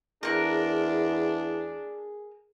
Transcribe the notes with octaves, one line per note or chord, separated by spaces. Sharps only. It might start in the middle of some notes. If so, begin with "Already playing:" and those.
E2 D4 G#4 A#4 F#6